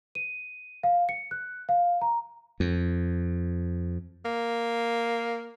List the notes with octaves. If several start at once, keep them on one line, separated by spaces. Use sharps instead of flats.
D#7
F5
C#7
F#6
F5
A#5
F2
A#3